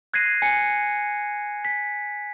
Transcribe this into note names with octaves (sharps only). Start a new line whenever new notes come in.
F#6 G#6 A#6 C7 D#7
G#5 C#7
B6